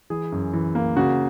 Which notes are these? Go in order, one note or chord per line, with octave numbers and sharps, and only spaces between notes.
E3 G#4
F#2
E3
A#3
C#3 F#4